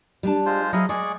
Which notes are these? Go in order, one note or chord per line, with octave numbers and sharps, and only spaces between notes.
G3 D4 A5
G#3 F4 C5
F#3 E4 G#4 D#5 F5
G#3 G#4 D5 C#6